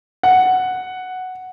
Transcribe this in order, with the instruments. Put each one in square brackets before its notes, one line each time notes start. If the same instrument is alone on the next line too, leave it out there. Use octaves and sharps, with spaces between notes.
[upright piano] F#5